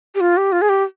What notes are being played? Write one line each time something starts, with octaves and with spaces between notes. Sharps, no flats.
G4
F4
G4
F4
G#4
G4